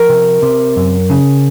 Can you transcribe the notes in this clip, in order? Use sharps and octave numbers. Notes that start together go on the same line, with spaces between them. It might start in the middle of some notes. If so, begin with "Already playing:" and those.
Already playing: F3 A#4
C3
C3
F#2
C#3